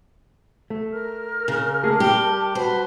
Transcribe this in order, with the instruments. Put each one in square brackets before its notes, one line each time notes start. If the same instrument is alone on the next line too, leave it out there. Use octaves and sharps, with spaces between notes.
[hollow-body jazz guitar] A3
[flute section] A#4 F6
[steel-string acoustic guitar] C#3
[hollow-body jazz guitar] A3 A#3 G#4 [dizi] A5
[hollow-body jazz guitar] G3 [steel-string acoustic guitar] G4
[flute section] F#4 B4 [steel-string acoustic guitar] C5